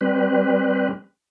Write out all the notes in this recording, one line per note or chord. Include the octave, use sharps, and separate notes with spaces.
G3 C4 B4